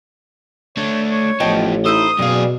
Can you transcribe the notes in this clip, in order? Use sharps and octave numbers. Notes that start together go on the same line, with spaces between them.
A3 D4 C#5
C#5
A1 F3 B3 D#5 G5 A5
D#4 E4 A4 C5 D#6
F#2 B2 G3 G#4 F5